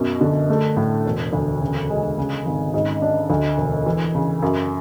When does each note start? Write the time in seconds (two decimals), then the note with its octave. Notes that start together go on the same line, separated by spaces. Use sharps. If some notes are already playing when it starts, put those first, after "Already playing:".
Already playing: F#2 B2
0.21 D3
0.50 A3
0.77 A2
1.06 E1
1.33 D2
1.61 C#3
1.90 G#3
2.18 C#3
2.45 G#1
2.74 G#2
3.02 D4
3.30 D2
3.58 E1
3.86 E3
4.15 C#3
4.42 F#2